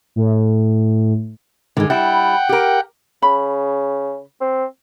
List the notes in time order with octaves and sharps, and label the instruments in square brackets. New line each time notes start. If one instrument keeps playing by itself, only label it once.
[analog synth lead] A2
[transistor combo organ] G#2 D#3 [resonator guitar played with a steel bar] D3 G#3
[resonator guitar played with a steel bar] G3 E4 [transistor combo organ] F#5 G5
[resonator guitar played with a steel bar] G4 A#4
[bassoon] C#3 [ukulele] B5
[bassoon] C4